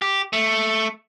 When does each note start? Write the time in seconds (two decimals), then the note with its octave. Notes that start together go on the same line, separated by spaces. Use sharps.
0.02 G4
0.33 A3